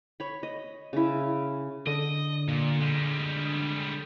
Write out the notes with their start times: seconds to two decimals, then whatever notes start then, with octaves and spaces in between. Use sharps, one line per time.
0.20 C#5 B5
0.43 D#5
0.93 C#3 E4
1.87 D3 D#5
2.48 A#2
2.81 G3 G#3